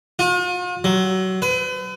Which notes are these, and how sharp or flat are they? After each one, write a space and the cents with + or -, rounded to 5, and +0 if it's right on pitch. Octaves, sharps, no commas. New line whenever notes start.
F4 +45
F#3 +25
B4 +40